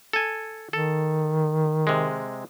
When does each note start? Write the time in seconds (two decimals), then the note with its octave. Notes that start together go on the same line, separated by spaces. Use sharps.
0.13 A4 G#5
0.73 D#3 A4
1.87 C3 G#3